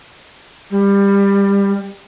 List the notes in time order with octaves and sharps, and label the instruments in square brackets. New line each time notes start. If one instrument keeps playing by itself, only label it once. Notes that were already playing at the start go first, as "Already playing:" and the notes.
[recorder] G3